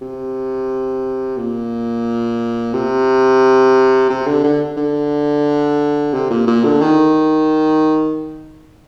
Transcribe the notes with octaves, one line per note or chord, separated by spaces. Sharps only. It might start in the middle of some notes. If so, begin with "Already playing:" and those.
C3
A#2
C3
C3
D3
D3
D3
C3
A#2
A#2
D3
D#3